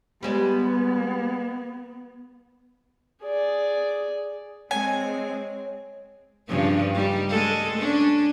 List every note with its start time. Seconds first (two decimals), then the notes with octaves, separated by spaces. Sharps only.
0.23 G3 G#3 B3 D5
3.24 G#4 D5
4.71 G#3 C4 C#5 G#5
6.48 G2 C#3 F3
6.94 G3 D#4
7.29 G#3 A4
7.78 C#4 D4